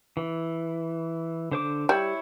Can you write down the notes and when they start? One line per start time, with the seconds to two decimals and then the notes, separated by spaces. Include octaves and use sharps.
0.17 E3
1.52 D3 C5 D6
1.89 G3 E4 C#5